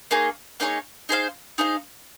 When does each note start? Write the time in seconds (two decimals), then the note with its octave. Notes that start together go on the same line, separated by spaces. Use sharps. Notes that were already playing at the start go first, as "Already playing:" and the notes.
0.11 A#3 D#4 G#4 C#5
0.60 A#3 D#4 G#4 C#5
1.09 D#4 G#4 C5 F5
1.58 D#4 G#4 C5 F5